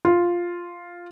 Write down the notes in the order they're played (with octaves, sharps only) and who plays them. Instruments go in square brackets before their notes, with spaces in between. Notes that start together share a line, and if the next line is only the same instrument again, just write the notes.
[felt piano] F4